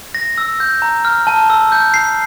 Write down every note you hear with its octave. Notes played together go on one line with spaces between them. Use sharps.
A#6
E6
G6
A#5
F6
A5
E6
G6
C7